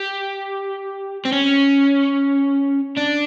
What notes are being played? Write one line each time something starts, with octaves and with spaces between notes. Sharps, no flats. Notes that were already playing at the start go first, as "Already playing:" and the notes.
Already playing: G4
C4
C#4
D4